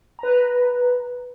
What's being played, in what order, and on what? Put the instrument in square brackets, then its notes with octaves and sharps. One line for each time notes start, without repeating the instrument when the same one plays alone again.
[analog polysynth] B4 A#5